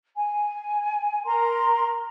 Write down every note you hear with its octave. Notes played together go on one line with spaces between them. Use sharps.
G#5
A#4 A#5 C6